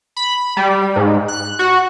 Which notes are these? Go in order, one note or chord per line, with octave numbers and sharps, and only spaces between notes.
B5
G3
G#2
F#6
F#4